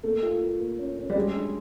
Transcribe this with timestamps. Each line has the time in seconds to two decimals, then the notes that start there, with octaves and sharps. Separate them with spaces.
0.03 A3 A#3
0.23 F4
0.41 F4
0.60 A#3
0.79 C#4
0.97 C#4
1.10 G3
1.15 F#3 G#3
1.34 D4